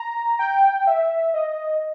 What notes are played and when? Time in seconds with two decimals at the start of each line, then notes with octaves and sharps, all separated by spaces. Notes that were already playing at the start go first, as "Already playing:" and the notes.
Already playing: A#5
0.39 G5
0.87 E5
1.34 D#5